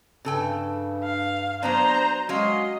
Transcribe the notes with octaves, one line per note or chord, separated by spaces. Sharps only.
G2 C#3 A4 G5
F5
F#3 B3 D4 C5 A#5
F#3 G#3 C#4 F#4 D#5 F5 C6